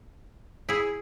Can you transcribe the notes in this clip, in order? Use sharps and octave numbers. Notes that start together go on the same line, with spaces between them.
E4 G#4